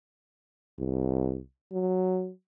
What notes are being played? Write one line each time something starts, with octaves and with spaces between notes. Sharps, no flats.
C2
F#3